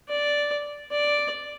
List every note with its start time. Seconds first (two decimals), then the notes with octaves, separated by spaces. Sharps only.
0.09 D5
0.91 D5